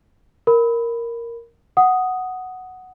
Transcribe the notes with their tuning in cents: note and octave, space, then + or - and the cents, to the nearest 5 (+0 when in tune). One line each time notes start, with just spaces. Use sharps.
A#4 +0 B5 +5
F#5 +0 D#6 +0